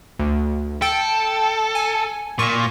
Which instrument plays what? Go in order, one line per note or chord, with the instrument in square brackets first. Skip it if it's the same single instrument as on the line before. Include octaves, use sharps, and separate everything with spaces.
[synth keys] D2
[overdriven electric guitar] A4 [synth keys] G5
[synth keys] G#5
[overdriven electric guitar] A#2 [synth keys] C#6